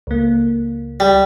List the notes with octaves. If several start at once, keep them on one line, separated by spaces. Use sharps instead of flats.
C#2 A#3
G3